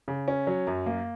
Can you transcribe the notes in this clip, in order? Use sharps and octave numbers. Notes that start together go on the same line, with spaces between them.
C#3
C#4
F#3
F#2
A#3